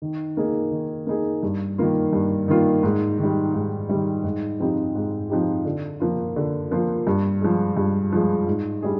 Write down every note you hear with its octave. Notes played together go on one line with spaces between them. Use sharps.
D#3
A#3 D#4 G#4
D#3
A#3 D#4 G#4
G2
D#3 A#3 F4
G2
D#3 A#3 F4
G#2
D#3 G3
G#2
D#3 G3
G#2
F3 C4 D#4 G4
G#2
F3 C4 D#4 G4
D3
F3 A#3 F4
D3
F3 A#3 F4
G2
F3 G#3
G2
F3 G#3
G#2
G3 D4 G#4